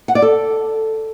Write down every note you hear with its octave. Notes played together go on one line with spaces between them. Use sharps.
F#5
D5
A4